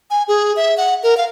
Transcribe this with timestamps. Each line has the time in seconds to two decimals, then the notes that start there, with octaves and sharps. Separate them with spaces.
0.10 G#5
0.28 G#4
0.56 E5
0.77 F#5
1.03 A#4
1.17 F5